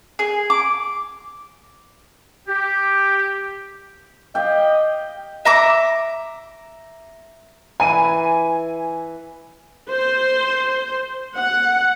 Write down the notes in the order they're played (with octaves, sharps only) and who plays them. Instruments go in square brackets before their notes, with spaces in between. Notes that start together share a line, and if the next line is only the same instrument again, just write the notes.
[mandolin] G#4
D6
[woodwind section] G4
[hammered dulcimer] G4 F5 G5 [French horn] D#5
[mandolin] E5 A#5 D6
[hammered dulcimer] E3 [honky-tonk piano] G#5 D#7
[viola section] C5
F#5